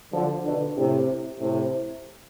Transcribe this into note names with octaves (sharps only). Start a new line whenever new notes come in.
D3 F3
B2 D3
A2 C3
A2 C3